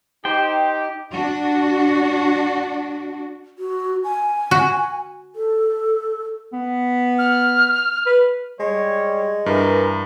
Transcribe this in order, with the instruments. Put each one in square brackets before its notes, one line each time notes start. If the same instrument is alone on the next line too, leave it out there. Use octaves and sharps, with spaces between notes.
[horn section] D#4 G4 [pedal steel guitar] C5 G5
[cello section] D4 F#4
[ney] F#4
G#5
[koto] F#4
[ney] A4
[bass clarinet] B3
[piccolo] F6
[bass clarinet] B4
[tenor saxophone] G3 [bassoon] G#3 [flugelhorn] C#5
[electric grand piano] G2 [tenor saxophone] E3 [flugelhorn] A#4